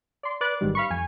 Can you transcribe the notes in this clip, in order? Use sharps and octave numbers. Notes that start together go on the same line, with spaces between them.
D5 C6
B4 D5 D6 F#6 A6
A1 G#2 D#3 G3
F5 B5 C#6
F2 G#5